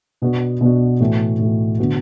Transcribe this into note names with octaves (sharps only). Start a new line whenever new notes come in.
B2 B3 D4 F#4
B2 B3 D4 F#4
A2 E3 A3 F#4
A2 E3 A3 F#4
D3 B3 F#4